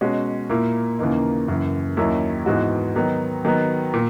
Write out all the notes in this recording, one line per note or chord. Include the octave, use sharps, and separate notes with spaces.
B2 G#3 C#4 F#4
A#2 A#3 E4
D#2 C#3 E3 A#3 D#4
F#2 C#3 E3
D#2 D#3 F#3 C#4 E4
G#2 E3 G#3 B3 F#4
D#3 F#3 B3 D#4
D#3 F#3 B3
A#2